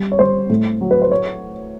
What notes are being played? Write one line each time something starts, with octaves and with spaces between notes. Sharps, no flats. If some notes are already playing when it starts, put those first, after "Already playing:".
Already playing: G3
C#5
G3 C5
A2
F#3
B4
C5
C#5